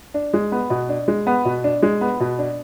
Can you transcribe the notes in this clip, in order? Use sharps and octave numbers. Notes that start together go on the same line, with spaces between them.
D4
G#3
B3
B2
D4
G#3
B3
B2
D4
G#3
B3
B2
D4